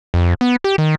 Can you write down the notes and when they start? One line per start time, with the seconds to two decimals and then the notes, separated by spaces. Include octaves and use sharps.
0.14 F2
0.41 B3
0.64 G4
0.78 D#3